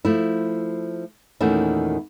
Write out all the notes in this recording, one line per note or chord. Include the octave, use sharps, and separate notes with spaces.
F3 A3 E4
E2 A#2 D#3 A3 C#4 E4